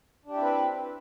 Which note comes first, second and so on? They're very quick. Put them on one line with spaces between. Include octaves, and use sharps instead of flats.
D4 G4 E4 C4 B4